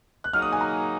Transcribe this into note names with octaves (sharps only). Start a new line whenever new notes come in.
F#6
F#3 A#3 D#4 G#4 F6
D#6
G#5
A#5